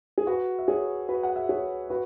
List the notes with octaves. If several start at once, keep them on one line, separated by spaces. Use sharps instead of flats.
G#4
F#4 B4
E5
G#4 C#5
F#4 B4
F#5
E5
G#4 C#5
F#4 B4